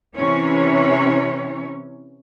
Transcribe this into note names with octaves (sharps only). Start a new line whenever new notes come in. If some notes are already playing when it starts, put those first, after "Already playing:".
C3 E3 C#4 C#5